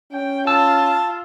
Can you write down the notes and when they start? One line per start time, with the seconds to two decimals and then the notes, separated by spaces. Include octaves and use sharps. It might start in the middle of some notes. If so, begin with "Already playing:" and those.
0.12 C#4 G5
0.47 F4 A5 E6